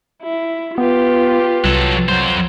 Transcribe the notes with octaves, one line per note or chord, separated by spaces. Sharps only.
E4
B3 F4 G4 B4
C2 F#3 A4
F2 F#3 C5